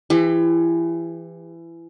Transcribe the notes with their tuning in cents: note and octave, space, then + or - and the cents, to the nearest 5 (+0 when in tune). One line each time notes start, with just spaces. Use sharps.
E3 +25 G4 +35